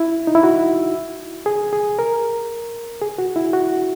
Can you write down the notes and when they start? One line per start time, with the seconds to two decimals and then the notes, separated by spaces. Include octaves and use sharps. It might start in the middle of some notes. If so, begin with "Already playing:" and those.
Already playing: E4
0.27 D#4
0.35 E4
0.43 F#4
1.46 G#4
1.73 G#4
1.99 A#4
3.01 G#4
3.18 F#4
3.36 E4
3.53 F#4